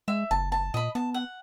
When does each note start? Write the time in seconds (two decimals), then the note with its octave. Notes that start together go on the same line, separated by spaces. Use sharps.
0.08 G#3 E5
0.31 F#1 A5
0.52 A5
0.74 A#2 D#5 B5
0.95 B3 A5
1.14 F#5